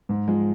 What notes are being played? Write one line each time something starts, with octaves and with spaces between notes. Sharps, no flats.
G#2
F3 G#3